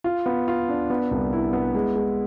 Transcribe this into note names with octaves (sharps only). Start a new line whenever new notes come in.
F4
B3
F4
D4
B3
C2
E4
B3
G#3
G#3